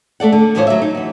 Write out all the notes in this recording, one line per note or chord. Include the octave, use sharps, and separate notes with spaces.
A3 A4 D5 F#5
D3
D2 A2 E3 F3 C5 C#5
F#3 E5
D2 D#4
E2 B3